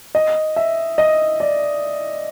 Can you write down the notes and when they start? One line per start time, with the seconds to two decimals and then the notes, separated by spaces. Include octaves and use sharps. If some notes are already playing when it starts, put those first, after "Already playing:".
0.15 D#5
0.56 E5
0.98 D#5
1.40 D5